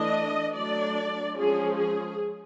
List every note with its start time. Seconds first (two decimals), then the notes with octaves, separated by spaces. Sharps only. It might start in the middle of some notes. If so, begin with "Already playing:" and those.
Already playing: E3 A3 D4 D#5
0.55 F#3 A3 D4 D5
1.36 F3 G#3 C#4 G#4
1.77 G#4